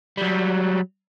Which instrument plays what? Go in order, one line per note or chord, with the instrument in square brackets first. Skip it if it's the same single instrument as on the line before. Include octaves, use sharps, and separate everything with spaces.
[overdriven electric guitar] F#3 G3